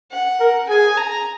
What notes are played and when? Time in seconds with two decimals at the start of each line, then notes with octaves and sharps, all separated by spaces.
0.11 F#5
0.40 A#4
0.69 G#4 G#5
0.97 A#5